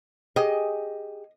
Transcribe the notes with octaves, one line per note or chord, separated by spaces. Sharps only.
G4 G#4 D#5 G#5